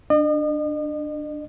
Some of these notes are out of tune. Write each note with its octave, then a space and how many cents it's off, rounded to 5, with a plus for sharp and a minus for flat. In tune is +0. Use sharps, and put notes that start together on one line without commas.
D4 +10 D#5 -40